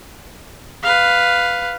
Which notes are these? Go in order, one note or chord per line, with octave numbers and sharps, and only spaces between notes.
B4 F5